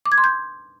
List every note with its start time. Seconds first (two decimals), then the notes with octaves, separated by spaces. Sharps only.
0.06 D6
0.12 G#6
0.18 C6
0.24 G6